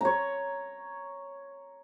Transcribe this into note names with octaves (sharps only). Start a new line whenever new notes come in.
C#5 A#5